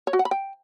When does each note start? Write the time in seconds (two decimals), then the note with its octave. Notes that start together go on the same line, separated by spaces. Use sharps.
0.07 C#5
0.13 F#4
0.19 F#5
0.25 B5
0.31 G5